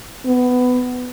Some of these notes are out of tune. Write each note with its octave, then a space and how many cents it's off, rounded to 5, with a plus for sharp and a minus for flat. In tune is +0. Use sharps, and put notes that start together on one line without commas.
B3 +15